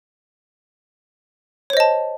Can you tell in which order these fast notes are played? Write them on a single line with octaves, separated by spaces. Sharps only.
C#5 C5 D#5 A5